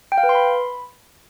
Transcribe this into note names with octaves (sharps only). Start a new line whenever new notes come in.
G5
F5
B4
C6
B5